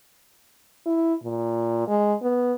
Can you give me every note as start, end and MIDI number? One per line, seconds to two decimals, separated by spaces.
0.86 1.15 64
1.24 1.87 46
1.88 2.14 56
2.22 2.54 59